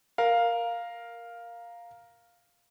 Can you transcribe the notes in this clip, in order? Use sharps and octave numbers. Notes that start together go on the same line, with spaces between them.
A#4 F5